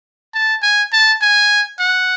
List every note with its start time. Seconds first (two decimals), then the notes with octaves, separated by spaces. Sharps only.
0.34 A5
0.63 G#5
0.93 A5
1.22 G#5
1.80 F#5